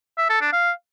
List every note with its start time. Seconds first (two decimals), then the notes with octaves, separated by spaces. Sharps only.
0.18 E5
0.30 A4
0.41 D4
0.53 F5